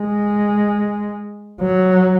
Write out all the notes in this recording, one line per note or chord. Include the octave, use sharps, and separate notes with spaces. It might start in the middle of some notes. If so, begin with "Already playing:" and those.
Already playing: G#3
F#3